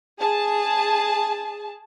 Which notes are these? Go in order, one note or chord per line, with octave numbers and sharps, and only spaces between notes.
G#4 A5